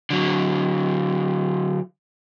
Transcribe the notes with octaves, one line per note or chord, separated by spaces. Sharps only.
D3 F#3